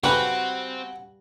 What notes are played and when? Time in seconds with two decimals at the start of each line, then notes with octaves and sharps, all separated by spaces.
0.04 C#3 G3 C4 F#4 B4